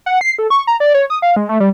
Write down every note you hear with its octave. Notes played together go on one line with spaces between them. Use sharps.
F#5
C7
A4
C#6
A#5
D5
C#5
D#6
F5
G#3
A3
G3